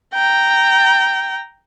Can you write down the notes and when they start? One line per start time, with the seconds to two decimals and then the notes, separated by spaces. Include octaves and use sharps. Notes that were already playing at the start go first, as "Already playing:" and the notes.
0.14 G5 A#5